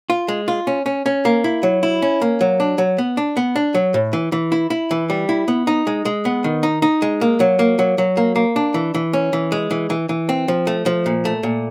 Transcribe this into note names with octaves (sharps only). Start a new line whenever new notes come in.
F4
G#3
F4
C#4
C#4
C#4
A#3
E4
F#3
E4
C#4
A#3
F#3
D4
F#3
B3
D4
B3
D4
F#3
A2
E3
E3
E4
E4
E3
G3
E4
B3
D#4
G#3
G#3
B3
D#3
D#4
D#4
G#3
A#3
F#3
A#3
F#3
F#3
A#3
A#3
D4
E3
E3
C#4
E3
G#3
E3
E3
E3
C4
F3
A3
F3
A#2
A3
A#2